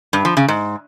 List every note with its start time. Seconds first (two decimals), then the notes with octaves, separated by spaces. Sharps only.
0.13 G2
0.25 F3
0.37 C#3
0.48 G#2